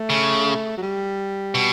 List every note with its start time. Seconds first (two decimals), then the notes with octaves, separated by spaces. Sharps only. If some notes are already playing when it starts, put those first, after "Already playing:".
Already playing: A3
0.10 C#3
0.77 F#3
0.82 G3
1.55 B2